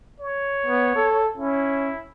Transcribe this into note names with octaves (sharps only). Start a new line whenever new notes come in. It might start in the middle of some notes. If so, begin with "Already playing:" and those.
C#5
B3
A4
C#4 E4